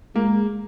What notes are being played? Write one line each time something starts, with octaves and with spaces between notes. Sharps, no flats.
G#3 A#3